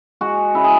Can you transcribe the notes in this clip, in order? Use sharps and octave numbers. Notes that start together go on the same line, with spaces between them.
G#3 F#4
C#3 E4
G#4